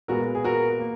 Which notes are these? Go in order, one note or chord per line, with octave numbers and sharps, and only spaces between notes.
A#2 G#3 B3 F#4 A#4
G#4
F#4 A#4
A#3